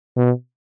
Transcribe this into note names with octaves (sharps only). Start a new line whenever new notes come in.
B2